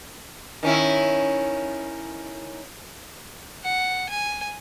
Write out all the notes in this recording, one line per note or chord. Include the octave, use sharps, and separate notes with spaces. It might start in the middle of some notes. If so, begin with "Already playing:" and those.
D#3 C#4 E4
F#5
G#5